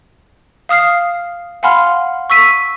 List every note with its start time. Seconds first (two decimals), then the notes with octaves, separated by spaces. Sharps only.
0.69 F5 D#6 F6 C7
1.63 F5 F#5 G#5 B5 C6 F6
2.30 C#6 E6 B6 D#7